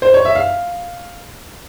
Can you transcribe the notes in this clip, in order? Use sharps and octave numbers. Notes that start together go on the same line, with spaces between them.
C5
C#5
E5
F5